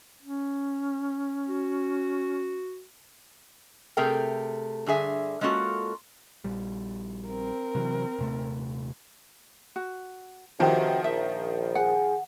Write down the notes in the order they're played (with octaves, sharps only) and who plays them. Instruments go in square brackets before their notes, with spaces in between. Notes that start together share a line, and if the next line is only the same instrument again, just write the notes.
[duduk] C#4
[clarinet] F#4
[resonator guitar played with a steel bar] C3 A3 G#4 A#4 G5
G2 D3 G#4 E5
G#3 A#3 C#4 F4 F#4 A4
[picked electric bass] A#1 G3
[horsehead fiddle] C4 A#4
[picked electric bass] C3 E3 F#3
D#1 C3 A3
[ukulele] F#4
[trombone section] C#2 C3 F#4 [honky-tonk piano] D#3 F3 [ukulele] D4 G4
[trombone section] A#1 [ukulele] E5
[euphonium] G#4 [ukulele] F#5